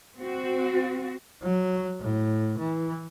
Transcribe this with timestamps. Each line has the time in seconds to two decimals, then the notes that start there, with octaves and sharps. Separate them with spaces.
0.19 C4 F#4
1.43 F#3
2.01 A2
2.58 E3